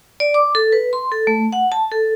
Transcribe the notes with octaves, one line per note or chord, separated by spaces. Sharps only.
D5
D6
A4
B4
C6
A4
A3
F#5
A5
A4